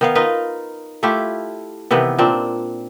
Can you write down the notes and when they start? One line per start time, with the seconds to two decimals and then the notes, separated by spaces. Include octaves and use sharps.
0.01 D#3 B3 F5
0.15 D#4 F4 A#4 B4
1.03 A3 E4 F4 G4
1.91 C3 D#3 E3 B3
2.18 A#2 C4 D4